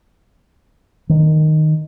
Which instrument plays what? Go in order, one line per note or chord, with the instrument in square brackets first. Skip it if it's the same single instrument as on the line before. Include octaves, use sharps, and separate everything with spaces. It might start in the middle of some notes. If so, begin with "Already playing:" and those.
[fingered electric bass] D#3